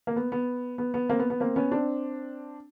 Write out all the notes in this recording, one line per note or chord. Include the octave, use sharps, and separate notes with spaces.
A#3
B3
B3
B3
B3
A#3 C4
B3
B3
A#3 C4
B3 C#4
C4 D4